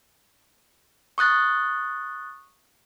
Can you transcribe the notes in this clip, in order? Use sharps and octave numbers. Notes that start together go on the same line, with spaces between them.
C#6 D#6 F#6 A6